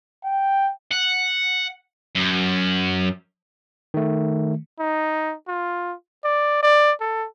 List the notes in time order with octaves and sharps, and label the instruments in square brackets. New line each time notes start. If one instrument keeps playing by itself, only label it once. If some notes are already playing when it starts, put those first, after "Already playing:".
[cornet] G5
[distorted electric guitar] F#5
F#2
[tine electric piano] D#3 A3
[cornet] D#4
F4
D5
D5
A4